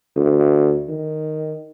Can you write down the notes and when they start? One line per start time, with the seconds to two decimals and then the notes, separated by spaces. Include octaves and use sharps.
0.16 D2
0.88 D#3